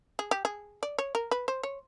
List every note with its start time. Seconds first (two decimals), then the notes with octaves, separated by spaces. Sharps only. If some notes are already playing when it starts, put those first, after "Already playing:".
0.19 G#4
0.31 G4
0.45 G#4
0.83 D5
0.99 C#5
1.15 A#4
1.31 B4
1.48 C5
1.63 C#5